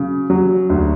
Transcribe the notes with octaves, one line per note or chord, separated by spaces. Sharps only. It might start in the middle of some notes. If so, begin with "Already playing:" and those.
Already playing: C#3 F#3
F#3
D2